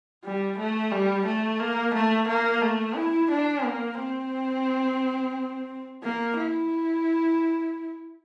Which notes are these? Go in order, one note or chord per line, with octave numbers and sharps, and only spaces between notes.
G3
A3
G3
A3
A#3
A3
A#3
A3
E4
D4
A#3
C4
A#3
E4